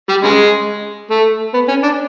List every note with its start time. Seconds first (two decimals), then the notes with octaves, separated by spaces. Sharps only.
0.09 G3
0.23 C#3 G#3
1.10 A3
1.54 B3
1.68 C#4
1.83 D4